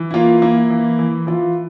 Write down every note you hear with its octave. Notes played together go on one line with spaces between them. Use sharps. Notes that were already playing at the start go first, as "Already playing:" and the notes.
Already playing: E3
E4
A#3 F4
A#3 E4
E3
E3
E3 F4